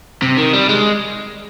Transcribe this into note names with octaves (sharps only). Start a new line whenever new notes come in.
C3
D#3
G3
G#3